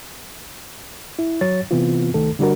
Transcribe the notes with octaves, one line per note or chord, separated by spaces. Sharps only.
E4
F#3 C#5 A6
C3 E3 B3 C4 F4
C2 D#3 A3 A4
D3 G3 D4 F#4 A#4